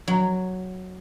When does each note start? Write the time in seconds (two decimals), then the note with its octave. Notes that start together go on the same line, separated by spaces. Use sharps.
0.08 F#3